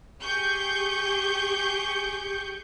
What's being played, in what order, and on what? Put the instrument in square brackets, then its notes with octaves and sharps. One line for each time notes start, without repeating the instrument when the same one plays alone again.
[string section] G4 G#4 C#6 G6